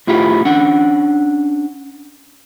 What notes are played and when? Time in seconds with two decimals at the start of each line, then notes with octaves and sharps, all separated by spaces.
0.07 A2 E4 F4 G4
0.45 C#4 D4 F#5